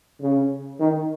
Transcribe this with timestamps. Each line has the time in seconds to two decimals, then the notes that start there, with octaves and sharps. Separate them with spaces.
0.21 C#3
0.80 D#3